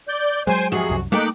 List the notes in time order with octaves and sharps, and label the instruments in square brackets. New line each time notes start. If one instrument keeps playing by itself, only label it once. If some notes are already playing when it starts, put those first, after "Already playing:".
[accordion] D5 G6
[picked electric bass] F#3 G#3 [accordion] C5 G#5 [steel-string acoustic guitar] G5
[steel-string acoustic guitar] F2 F#4 [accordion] C3 G#4
[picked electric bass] C2 F#2
[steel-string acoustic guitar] A3 G5 [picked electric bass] A#3 [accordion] D#4 D6 F#6